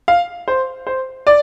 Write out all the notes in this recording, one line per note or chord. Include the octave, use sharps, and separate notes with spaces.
F5
C5
C5
D5